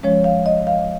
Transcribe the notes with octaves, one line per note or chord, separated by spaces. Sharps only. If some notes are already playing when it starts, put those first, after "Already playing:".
F3 G#3 C#4 C#5
F5
D#5
F5